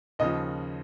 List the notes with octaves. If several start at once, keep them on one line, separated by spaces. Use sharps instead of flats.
D#2 C#3 F3 D#5